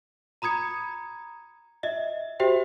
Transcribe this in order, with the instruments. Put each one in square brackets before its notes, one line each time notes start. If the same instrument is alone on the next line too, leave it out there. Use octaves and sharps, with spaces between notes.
[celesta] A#5 B5 D#6 G#6 C#7
D#5 E5
F#4 G4 C5 E5 G5